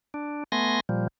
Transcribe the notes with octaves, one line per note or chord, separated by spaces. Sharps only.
D4
A3 B3 G#5 C6 A#6
A#2 F3 G3